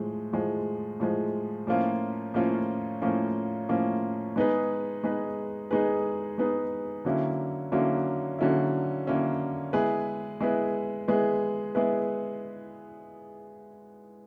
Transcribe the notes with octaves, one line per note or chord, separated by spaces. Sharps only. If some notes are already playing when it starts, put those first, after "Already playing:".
Already playing: A2 F3 G#3
A2 F3 G#3
A2 F3 G#3
A2 F3 A#3 C#4 F4
A2 F3 A#3 C#4 F4
A2 F3 A#3 C#4 F4
A2 F3 A#3 C#4 F4
G#3 B3 D#4 G#4 B4
G#3 B3 D#4 G#4 B4
G#3 B3 D#4 G#4 B4
G#3 B3 D#4 G#4 B4
D3 F#3 A#3 C#4 E4
D3 F#3 A#3 C#4 E4
D3 F#3 A#3 C#4 E4
D3 F#3 A#3 C#4 E4
G#3 B3 E4 G#4 B4
G#3 B3 E4 G#4 B4
G#3 B3 E4 G#4 B4
G#3 B3 E4 G#4 B4